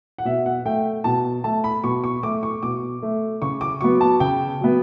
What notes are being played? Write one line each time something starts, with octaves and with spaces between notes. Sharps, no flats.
F#5
B2 E5
F#5
A3 G5
B2 A5
A3 A5
B5
B2 C#6
C#6
A3 D6
C#6
B2 D6
A3
C#3 C#6
D6
F#3 B3 C#6
A5
C#3 G5
F#3 B3